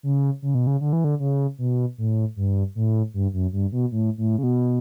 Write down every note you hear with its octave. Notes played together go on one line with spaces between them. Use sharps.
C#3
C#3
B2
C#3
D3
E3
D3
C#3
B2
A2
G2
A2
G2
F#2
G2
B2
A2
A2
C#3
B2